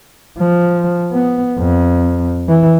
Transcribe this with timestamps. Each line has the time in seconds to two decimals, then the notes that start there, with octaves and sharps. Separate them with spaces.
0.39 F3
1.13 B3
1.59 F2
2.49 E3